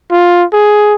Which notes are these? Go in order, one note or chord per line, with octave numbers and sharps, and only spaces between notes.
F4
G#4